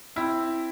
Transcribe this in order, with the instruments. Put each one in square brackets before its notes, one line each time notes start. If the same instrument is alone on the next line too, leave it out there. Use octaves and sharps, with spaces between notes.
[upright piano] C4 E4